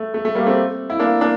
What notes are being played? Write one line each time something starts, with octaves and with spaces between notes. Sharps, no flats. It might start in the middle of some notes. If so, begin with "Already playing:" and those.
Already playing: A3
A3
A3
G3 A#3
A3 C4
E4
A#3 D4
A#3 D4